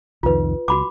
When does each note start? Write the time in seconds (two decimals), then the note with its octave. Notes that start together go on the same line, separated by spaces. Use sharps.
0.23 C2 F2 D#3 F4 B4
0.68 C#2 F#4 B5 D6